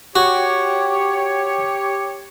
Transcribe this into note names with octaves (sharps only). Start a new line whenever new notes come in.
F#4 G4 C#5